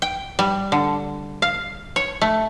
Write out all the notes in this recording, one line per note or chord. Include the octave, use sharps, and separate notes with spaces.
G5
G3
D3
F5
C#5
A3